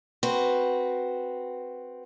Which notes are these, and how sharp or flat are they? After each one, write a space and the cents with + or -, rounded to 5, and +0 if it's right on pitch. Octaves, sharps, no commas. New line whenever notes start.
C4 +0 F#4 +0 B4 +0